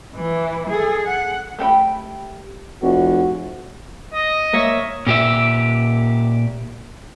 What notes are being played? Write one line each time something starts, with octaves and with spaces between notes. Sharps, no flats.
E3
G#4 A4
F#5
A3 G4 G5 B5
F1 F#4
D#5
A#3 C#5 E5
A#2 G4 E5